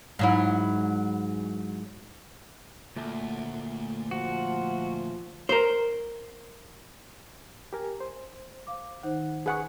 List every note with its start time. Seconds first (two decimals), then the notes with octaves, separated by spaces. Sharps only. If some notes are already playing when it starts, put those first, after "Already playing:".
0.19 G#2 F#3 E4
2.96 D2 A#2 A3
4.11 F3 F#4
5.49 A#4 C5
7.73 G4 A#4 G#5
8.00 C5
8.67 F5 D6
9.03 D#3 D#4 C5 F#5
9.46 G#4 B4 F#5 C#6